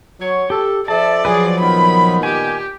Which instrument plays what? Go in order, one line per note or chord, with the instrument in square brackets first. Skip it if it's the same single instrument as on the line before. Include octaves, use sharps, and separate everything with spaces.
[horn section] F#3 C#5
[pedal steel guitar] G4 [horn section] A4
[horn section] F3 A4 E5 [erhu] D5 [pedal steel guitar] A5
[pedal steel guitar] F3 F#3 B4 [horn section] G#4
[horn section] A#2 D#3 B3 [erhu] B5
[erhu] G4 [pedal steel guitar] G#5